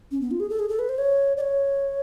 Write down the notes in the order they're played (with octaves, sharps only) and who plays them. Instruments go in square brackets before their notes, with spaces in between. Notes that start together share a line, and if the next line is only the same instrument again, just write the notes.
[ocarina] C#4
B3
F4
G#4
A4
G#4
A4
B4
C5
C#5
D5
C#5